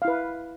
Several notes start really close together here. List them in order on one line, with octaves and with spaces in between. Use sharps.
F5 E4 B4